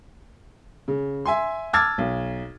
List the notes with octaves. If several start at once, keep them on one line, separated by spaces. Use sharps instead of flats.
C#3
E5 G#5 C6
A5 D6 E6 F6 G#6 A6
B1